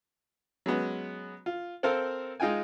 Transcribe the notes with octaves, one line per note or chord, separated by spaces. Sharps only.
F#3 G#3 B3 C#4
F4
C4 A4 A#4 C5 F5
G#3 D#4 F4 G5 G#5